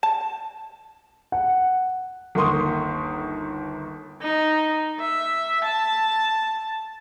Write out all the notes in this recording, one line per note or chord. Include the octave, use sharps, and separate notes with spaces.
A5
F#5
G1 D#2 A#3 C6 C#6 D#6
D#4
E5
A5